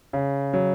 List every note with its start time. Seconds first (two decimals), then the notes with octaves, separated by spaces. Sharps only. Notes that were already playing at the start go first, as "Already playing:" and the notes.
0.13 C#3
0.53 F#3